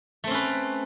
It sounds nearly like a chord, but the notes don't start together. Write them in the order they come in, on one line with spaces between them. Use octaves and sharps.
A3 C4 C#4 B4